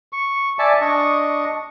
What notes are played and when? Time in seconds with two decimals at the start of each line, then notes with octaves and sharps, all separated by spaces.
0.13 C#6
0.59 D5 E5 G#5 A5
0.81 D4 D#5 C#6